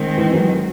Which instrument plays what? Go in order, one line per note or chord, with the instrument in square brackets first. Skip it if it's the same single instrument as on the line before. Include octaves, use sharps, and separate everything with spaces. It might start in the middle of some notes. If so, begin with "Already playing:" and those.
Already playing: [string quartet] D#3 G#3 C4
[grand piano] E3
F#3